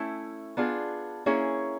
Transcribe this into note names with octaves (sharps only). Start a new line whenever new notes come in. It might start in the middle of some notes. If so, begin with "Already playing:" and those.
Already playing: A3 C#4 E4
B3 D4 F4 G#4
A#3 C#4 E4 G#4 C#5